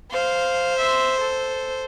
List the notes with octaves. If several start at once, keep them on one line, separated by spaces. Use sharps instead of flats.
C5 F5
E5 C6
A4